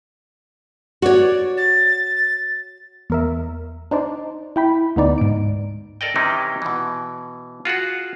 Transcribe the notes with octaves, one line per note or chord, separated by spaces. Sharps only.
F#4 C#5 D5
A6
E2 A#4 E5
D4 D#4 C5 D5
E4 G5 B5
D2 B3 D#4 D5
G#2 D7
A4 A#4 D5 D#5 G5
C3 D#3 E3 C#4 D#4 E4
B2 E3
F4 F#4 G#4 F#5